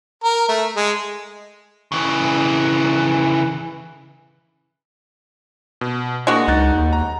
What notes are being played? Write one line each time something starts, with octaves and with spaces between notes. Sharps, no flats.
A#4
A3
G#3
C#3 E3
B2
G#3 A#3 D4 F#4
C#2 D#4 F#6 A6
D#2
A#5